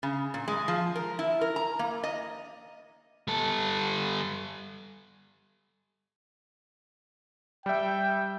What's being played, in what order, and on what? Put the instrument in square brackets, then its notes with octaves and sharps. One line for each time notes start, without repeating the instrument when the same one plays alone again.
[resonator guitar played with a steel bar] C#3
A#2
G#3
F3
A#4
E4
A#4
A#5
A#3
D#5
[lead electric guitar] G3 A4
[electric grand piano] G3 E5 [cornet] G5